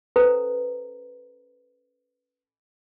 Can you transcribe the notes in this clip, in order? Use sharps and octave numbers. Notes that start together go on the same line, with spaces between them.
C#4 A4 B4 C5 A#5